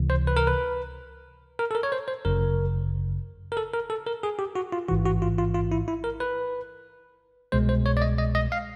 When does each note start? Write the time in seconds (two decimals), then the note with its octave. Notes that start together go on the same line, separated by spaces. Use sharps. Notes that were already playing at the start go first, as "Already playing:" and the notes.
Already playing: C#2 C3 E3
0.10 C5
0.27 B4
0.37 A#4
0.47 B4
1.59 A#4
1.71 A4
1.75 A#4
1.83 C#5
1.92 C5
2.08 C5
2.25 G1 F#2 C#3 A#4
3.52 A#4
3.57 A4
3.74 A#4
3.90 A4
4.07 A#4
4.23 G#4
4.39 G4
4.55 F#4
4.72 F4
4.88 A1 G#2 E3 F#4
5.06 F#4
5.22 F4
5.38 F4
5.54 F4
5.72 E4
5.88 E4
6.04 A#4
6.20 B4
7.52 C2 B2 G#3 C5
7.69 C5
7.86 C#5
7.97 D5
8.02 D#5
8.18 D#5
8.35 D#5
8.52 F5